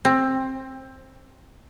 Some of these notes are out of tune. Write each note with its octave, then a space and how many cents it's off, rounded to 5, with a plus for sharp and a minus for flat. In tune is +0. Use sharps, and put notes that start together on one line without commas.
C4 +15